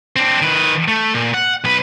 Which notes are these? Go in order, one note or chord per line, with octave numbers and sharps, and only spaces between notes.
C4 D4
D#3 B4
A3
A#2
F#5
B1 B4